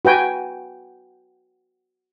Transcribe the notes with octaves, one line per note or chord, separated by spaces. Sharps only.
F#4 B4 G5 G#5